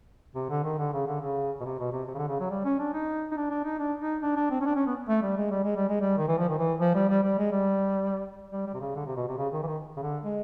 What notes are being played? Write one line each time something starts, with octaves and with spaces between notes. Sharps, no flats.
C3
D3
D#3
D3
C#3
D3
C#3
B2
C3
B2
C3
C3
C#3
D3
C#3
F#3
G3
C#4
D4
D#4
D#4
D4
D4
D#4
D4
D#4
D4
D4
C4
C#4
D4
C#4
B3
A3
G3
G#3
G3
G#3
G3
G#3
G3
D#3
E3
F3
D#3
E3
F3
G3
G3
G3
G#3
G3
G3
G3
C3
C#3
D3
C3
B2
C3
C#3
D#3
E3
D#3
C#3
D3
G#3